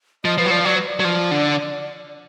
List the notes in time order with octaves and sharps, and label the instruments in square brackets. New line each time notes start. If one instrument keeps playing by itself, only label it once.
[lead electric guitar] F3 [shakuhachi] D#5
[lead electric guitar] F3 [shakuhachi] B4
[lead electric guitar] F#3
[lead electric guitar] F3 [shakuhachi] D5
[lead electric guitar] F#3 [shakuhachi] D5
[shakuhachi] B4
D5
[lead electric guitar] F#3
F3
D3